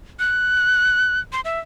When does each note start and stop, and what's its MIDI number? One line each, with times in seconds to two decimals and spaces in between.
0.19 1.20 90
1.33 1.41 84
1.45 1.59 76